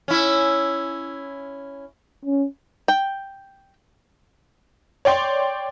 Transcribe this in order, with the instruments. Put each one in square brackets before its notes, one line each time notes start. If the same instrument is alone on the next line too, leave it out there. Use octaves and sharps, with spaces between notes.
[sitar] C#4 E4
[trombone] C#4
[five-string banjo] G5
[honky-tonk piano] C#5 D5 G5 C6